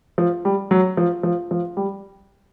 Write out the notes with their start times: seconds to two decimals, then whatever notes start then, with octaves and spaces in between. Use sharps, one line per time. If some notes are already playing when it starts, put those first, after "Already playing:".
0.18 F3
0.45 G3
0.71 F#3
0.97 F3
1.23 F3
1.51 F3
1.77 G3